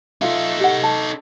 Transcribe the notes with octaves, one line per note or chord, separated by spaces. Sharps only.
D#4 F4 A4 E5 F5
G4 F#5
A5